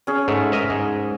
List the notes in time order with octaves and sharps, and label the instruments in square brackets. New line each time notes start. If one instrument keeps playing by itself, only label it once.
[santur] C#4 G#4
[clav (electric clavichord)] G#2 A3
A#4 D#5 E5
G#2